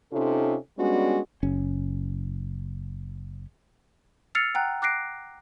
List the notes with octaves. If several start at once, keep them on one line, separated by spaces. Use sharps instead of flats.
C3 C#4 D#4 F4 A4
G3 G#3 B3 C#4 D4 F#4
F#1 C#4
E6 F6 A6 C7 C#7 F7
F#5 G5 A#5 F#6
D6 F#6 A#6 C7 D7